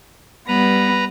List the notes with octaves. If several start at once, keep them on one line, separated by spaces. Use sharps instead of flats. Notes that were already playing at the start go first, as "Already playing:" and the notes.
G3 B3 B4 A#5